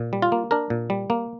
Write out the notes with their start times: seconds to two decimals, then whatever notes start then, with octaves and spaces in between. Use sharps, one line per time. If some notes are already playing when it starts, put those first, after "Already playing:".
Already playing: A#2
0.13 G3
0.22 F4
0.32 A#3
0.51 D4 A#4
0.70 A#2
0.90 G3
1.10 A#3